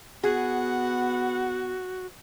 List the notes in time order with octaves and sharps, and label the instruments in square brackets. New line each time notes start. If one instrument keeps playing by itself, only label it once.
[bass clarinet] B3 [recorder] F#4 [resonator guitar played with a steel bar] G#4 [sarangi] F#5